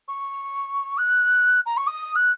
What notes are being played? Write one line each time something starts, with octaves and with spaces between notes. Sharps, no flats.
C#6
F#6
A#5
C#6
D#6
F#6